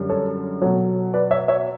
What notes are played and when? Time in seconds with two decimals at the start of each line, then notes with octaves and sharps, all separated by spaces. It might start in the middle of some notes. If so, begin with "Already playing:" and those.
Already playing: F#2 D3 G3
0.10 A4 C#5
0.62 B2 F#3 A4 C#5
1.13 B4 D5
1.31 C#5 E5
1.48 C#5 E5